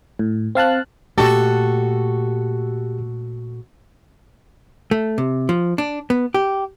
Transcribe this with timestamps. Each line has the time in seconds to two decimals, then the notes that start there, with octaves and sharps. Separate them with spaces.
0.19 A2
0.55 C4 F5 A5 F#6
1.18 A#2 A3 F#4 G4 A4
4.91 A3
5.18 C3
5.49 F3
5.78 D4
6.10 B3
6.34 G4